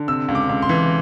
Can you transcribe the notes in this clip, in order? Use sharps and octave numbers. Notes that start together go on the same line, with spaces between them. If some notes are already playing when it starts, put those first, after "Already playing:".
Already playing: D3
C3 E6
C#2
D6
C#2
C6
E3